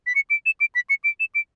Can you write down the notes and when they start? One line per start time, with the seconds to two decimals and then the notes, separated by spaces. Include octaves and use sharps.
0.07 B6
0.15 C#7
0.30 D7
0.46 E7
0.60 D7
0.75 B6
0.90 C#7
1.04 D7
1.20 E7
1.35 D7